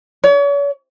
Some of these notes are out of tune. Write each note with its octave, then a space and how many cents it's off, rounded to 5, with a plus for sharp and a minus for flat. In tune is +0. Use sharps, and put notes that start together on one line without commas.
C#5 +40